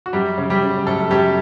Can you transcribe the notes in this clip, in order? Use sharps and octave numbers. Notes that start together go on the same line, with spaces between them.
F#4
F#2 G3 G4
C#3
G3 G4
C#3
F#2 A3 A4
F#2 G3 G4